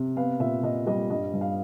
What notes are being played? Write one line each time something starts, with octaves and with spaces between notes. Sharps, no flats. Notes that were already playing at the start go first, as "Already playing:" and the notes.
Already playing: C3
B3 F5
A#2 E5
A#2 D#5
G3 D#5
G2 D#5
G2
F5